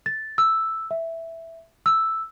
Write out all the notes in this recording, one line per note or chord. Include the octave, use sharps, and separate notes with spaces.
A6
E6
E5
E6